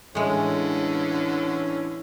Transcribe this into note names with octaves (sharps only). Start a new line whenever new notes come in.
A2 D3 E3 G#3 C#4